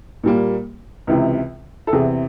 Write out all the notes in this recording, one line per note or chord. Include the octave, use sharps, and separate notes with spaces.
A#2 G3 A#3
C#2 C3 E3
A4
E2 C3 E3 G#4